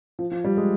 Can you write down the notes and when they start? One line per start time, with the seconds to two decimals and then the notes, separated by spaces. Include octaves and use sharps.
0.19 F3
0.31 F3
0.44 G3
0.57 G#3